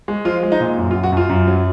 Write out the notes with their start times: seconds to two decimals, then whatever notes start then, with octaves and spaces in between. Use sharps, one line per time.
0.08 G#3
0.25 F3 F4
0.43 G#3
0.52 D#4
0.60 A#2
0.77 F#2
0.91 F4
0.95 F#3
1.03 F#4
1.12 F#2 F4
1.29 F#2
1.47 F#3